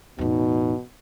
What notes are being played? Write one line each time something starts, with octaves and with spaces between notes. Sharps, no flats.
A1 E2 B2 D#4